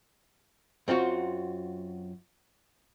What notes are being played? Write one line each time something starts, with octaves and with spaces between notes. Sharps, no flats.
F#2 C4 F4 F#4